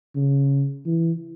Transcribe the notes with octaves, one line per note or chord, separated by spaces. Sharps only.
C#3
E3